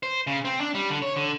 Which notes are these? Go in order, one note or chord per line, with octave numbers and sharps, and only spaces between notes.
C5
C#3
C4
D4
G3
D3
C#5
D3